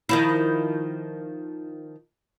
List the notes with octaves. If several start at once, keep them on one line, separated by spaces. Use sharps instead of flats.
D#3 F3 E4